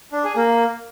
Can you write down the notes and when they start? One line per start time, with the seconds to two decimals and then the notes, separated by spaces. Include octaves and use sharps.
0.12 D4
0.24 G#4
0.36 A#3